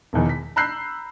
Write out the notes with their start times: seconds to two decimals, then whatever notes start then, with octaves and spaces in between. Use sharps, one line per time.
0.13 E1 E2 D#3
0.29 B6
0.56 A#5 B5 E6 F#6 G6 C7